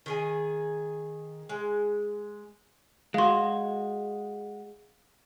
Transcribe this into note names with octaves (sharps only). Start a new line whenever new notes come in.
D#3 G#4 G#5
G#3
G#3 F#4 F5 C6